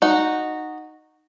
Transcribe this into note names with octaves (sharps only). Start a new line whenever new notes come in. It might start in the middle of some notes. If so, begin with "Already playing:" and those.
D#4 F#4